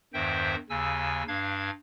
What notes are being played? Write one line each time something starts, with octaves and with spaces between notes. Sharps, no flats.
E2 G2 D#3 C5 E5 G5
D#2 C#3 G#5 E6
G2 D4 F5 G#6